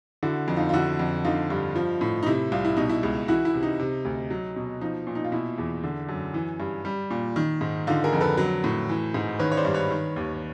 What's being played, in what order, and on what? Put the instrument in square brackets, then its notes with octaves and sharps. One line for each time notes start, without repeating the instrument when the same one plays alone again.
[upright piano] D3 E4 F#4
F2
D#4 F4
F4
D3 E4 F#4
F2
D3 D#4 F4
G2
F3
A2
D#4
C3 E4
C2 F4
E4
B2 D#4
E4
C#2
E3 E4 F#4
E4
C3
D#4
C3
D2
F#3
B2
F3 D#4
A#2
D#4
F4
B2 E4
E2
D3
F#2
E3
G2
G3
A#2
D#3
G#2
D3 D#4 F4
G#4 A#4
F2
A4 B4
F#3
A2
E3
G#2
D#3 B4 C#5
C#5
C5 D5
G2
B4 C#5
D#3
D#2